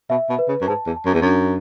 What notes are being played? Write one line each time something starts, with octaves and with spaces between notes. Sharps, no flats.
B2 E5
B2
B4
C#3
F#2
G#2 A5
E2
A5
F#2
E2
F#2 D4